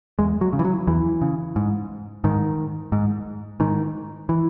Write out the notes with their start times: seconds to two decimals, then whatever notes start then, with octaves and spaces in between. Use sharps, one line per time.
0.19 E2 G#3
0.41 F#3
0.53 C#3
0.59 E3
0.65 F#3
0.87 E2 E3
1.21 C#3
1.56 G#2
2.24 G#2 D#3
2.92 G#2
3.60 G#2 D#3
4.29 E3